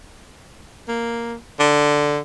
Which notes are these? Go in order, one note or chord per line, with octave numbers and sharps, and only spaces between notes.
A#3
D3